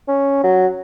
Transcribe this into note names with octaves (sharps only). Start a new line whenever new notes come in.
C#4
F#3